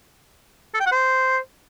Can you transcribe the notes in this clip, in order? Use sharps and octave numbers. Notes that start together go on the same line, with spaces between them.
A4
G5
F#5
C5